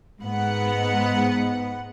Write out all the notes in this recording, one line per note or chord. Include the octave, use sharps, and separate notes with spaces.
G#2 B3 F#5